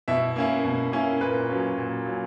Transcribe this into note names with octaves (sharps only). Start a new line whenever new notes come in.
B2 E4 E5
A#3 C#4 E4
B2
A#3 C#4 E4
A#2 B4
F#3 C#4
A#2
F#3 C#4